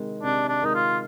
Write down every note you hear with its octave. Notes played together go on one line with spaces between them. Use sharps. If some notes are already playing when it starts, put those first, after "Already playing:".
Already playing: C3 D#3 G#3
C3 D4
D4
D#3 G#3 D#4
F4